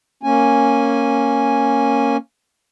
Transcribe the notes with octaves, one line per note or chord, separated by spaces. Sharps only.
A#3 C#4 G#5